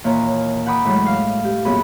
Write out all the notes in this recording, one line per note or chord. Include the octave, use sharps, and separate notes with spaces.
D#2 A#2 E3 C#5 A#5
F#5 G5 A#5 B5 D6 D#6
A2 E3 F#3 G#3
F5
G4
F#2 A#2 B3 F#4 G#4 B5